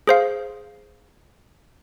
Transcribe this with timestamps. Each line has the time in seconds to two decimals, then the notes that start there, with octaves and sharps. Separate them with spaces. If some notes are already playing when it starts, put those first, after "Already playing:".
0.07 G#4 C5 F5